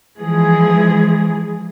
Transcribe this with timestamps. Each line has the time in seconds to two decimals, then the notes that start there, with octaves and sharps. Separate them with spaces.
0.18 E3 F3 G#3 G#4